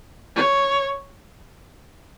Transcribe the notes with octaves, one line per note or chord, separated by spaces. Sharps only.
C#5